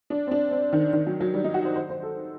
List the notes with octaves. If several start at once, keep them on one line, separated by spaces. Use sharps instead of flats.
D4
C4
D4
C4
D#3
D#3
F#3
F#3
G3
D#4
F#4
C5
C5
C5
A4